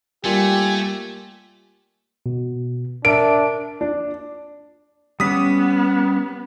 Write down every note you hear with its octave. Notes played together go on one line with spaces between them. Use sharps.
G3 A3 A#3 F4 G4 G#5
B2
D4 A#4 E5 D7
D4
G3 B3 C#4 D6 D#6 B6